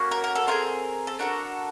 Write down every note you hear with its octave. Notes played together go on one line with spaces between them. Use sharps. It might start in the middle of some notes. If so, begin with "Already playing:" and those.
Already playing: A#3 C#4 F#4
A#4
A#4
A4
C4 F4 G#4 A#4
A4
D4 F#4 A4 A#4